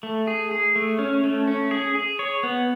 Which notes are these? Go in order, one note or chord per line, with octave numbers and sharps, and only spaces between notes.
A3
G#4
G#4
A3
C#4
A3
C#4
G#4
G#4
C#5
B3